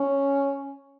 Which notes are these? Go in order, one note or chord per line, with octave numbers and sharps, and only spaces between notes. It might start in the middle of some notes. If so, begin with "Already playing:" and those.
Already playing: C#4